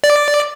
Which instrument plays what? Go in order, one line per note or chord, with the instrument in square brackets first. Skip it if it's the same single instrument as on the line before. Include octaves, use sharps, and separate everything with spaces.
[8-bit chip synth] D5